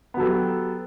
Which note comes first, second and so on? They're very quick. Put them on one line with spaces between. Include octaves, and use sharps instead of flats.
B3 F#3 A4 G4